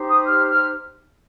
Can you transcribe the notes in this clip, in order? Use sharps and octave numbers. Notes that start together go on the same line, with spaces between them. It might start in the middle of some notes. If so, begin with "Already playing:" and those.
Already playing: D#4 G4 C5
D#6
F6
F6